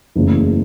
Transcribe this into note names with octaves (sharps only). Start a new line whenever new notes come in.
F#1 E2 C#3 F#3 A3